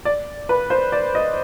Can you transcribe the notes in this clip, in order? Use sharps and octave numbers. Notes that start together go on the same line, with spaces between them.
D5
B4
C5
D5
D#5